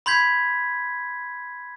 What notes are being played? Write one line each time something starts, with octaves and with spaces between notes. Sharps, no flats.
B5 C6 G6 G#6 B6